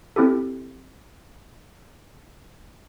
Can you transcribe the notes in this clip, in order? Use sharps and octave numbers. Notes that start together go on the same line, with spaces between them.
C4 E4 G4 A4